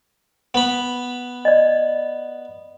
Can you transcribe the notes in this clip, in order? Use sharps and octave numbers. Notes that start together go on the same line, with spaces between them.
B3 B5
D5 D#5